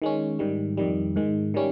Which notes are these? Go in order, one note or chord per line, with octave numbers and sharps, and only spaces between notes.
D#3 G#3 C#4
G#2 D#3 G3
F2 D#3 G3
G#2 D#3 G#3
D#3 G3 C#4